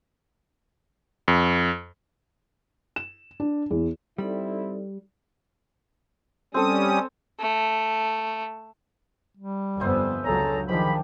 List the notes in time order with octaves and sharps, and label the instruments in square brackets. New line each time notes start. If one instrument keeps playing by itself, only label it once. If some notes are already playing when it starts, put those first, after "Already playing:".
[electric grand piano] F2
[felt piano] E7
D4
E2
[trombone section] C2 C4 E4 [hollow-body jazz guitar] G3 [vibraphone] D#4 A4 D5
[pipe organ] G3 C#4 D#6 [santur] C4 A4
[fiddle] A3
[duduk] G3
[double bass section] G1 F2 B3 [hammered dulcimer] C5 E5 G#5
[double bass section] C#2 D3 F#3 [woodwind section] G#4 C#5 A#5 [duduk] A4
[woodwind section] G#2 B5 [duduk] D#3 [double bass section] F3 [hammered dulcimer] D4 G4